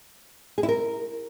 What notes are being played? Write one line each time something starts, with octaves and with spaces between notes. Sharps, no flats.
G#4
E4
A#4